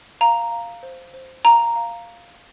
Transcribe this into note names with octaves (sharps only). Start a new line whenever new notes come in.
F5 A#5
F5
C5
C5
F5 A#5
F5